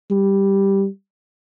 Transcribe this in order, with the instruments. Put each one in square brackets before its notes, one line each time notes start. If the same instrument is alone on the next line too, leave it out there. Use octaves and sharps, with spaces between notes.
[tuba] G3